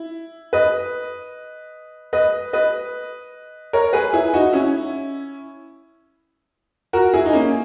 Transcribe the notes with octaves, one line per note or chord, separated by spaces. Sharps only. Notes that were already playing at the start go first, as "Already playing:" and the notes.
Already playing: E4
B4 D#5
B4 D#5
B4 D#5
A#4 C#5
G#4 B4
E4 G#4
D#4 F#4
C#4 E4
F#4 A#4
E4 G#4
D#4
A#3 C#4